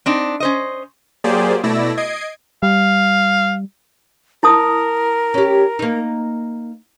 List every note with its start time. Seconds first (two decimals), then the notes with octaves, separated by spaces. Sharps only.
0.06 C4 D4 D#4
0.40 C#4 C5 D#5
1.24 F#3 A#3 G4 G#4 C5 D5
1.63 B2 A3 E4 D5 E6 A#6
1.97 D#5 G#6 C7 D7
2.63 G3 F5
4.43 E4 A#4 A5 D#6
5.34 C#4 G4
5.79 A#3 D#4